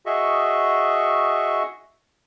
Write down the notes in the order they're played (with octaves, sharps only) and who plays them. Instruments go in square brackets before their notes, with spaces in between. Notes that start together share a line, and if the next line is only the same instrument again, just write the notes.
[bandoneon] F#4 G#4 D#5 E5 C#6